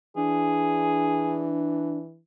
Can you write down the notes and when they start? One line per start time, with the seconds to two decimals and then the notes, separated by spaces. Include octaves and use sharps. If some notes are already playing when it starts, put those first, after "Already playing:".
0.17 E3 D4 G#4